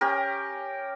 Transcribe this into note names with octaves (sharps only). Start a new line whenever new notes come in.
C#4 G4 A#4